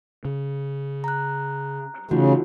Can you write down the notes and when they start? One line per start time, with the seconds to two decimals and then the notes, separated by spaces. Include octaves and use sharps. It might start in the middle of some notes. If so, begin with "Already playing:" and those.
0.25 C#3
1.04 A#5 F#6
2.11 C#3 E3 A3 D#4 F4 F#4